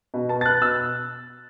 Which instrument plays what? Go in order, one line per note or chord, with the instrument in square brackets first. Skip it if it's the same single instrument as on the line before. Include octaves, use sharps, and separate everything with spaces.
[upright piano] B2
B3 A5
A6
B3 F#6
B2 E6